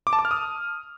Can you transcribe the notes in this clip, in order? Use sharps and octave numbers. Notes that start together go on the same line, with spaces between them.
D6
A5
D6
F6
D#6